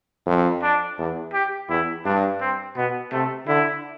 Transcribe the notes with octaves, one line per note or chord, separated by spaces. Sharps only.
F2
D4
E2
G4
E2 E4
G2 D4
C4
B2 B3
C3 A3
D3 E4